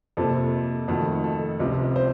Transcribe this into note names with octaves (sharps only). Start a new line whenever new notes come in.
F2 C3 F3 A#3 A4
F2 D#3 A3 F#4
A4
C#2 C3 F3
C5